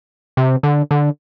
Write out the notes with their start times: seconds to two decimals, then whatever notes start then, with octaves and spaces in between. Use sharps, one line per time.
0.37 C3
0.63 D3
0.91 D3